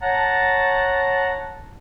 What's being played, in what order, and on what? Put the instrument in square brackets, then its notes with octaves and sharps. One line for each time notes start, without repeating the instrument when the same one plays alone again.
[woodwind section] C#5 A5 [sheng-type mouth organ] F#5 A#5